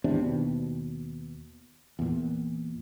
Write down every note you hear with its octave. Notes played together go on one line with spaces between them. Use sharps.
G#1 E2 C3 D4
D#2 B2
E2 A#2